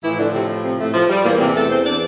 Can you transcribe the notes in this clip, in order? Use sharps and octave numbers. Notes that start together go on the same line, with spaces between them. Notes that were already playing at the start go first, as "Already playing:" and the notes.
A2 E3 F3 E4
D3 D4
C3 C4
C3 C4
A2 A3
F3
G3
E2 A#2 E3 A#3
C3 C4
A3 A4
C4 C5
D4 D5